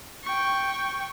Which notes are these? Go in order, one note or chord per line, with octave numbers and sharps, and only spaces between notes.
G5 C#6